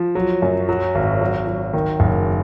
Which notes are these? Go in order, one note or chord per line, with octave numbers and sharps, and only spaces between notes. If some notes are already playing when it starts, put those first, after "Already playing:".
Already playing: F3
F#3
F#2
F#3
G#1
F#3
F#3
D#3
F#1